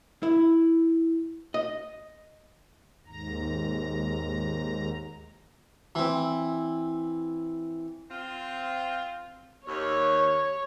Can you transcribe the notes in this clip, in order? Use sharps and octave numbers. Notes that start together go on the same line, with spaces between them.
E4
D#5
D#2 G#2 A#5
E3 C4
C4 F4
D#2 C#5